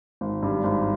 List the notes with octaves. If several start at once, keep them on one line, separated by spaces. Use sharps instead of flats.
G#1
G2
G#1